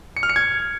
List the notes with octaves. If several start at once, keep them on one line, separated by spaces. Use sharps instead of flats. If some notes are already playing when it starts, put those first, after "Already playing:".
C#7
F6
C#7
G#6